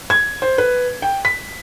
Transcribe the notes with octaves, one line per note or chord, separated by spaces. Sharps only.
G#6
C5
B4
G5
B6